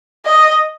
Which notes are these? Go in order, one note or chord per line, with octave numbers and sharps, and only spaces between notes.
D#5